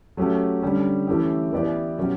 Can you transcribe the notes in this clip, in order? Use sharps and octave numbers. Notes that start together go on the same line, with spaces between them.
F#3 A3 C#4 G4
D3 G3 C#4
E3 A3 C#4 E4 G4
E3 B3 E4 G4 D5
B2 F#3 C#4 G4